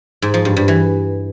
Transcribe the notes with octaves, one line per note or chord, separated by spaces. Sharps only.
G#2
F3
G2
G2
E3